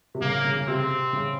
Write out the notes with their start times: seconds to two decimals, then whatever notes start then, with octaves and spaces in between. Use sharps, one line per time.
0.15 C3
0.21 C#3 A#3
0.44 C#3
0.56 C#3
0.67 C3 C4
1.13 C#3